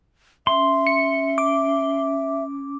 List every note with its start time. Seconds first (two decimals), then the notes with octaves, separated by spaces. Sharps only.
0.47 C#4 E5 C6
0.87 C#7
1.38 D6